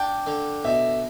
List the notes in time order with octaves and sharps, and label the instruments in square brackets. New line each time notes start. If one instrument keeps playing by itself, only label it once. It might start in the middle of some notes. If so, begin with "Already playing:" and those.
Already playing: [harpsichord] D4 [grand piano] G5
[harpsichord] D3
[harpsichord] B2 [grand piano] E5